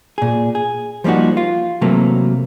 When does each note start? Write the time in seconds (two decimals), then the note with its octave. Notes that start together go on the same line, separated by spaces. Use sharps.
0.18 A#2 G#4
0.55 G#4
1.04 F3 G3 A#3 D#4 F#4
1.37 F4
1.81 C3 E3 F#3 A3 A#3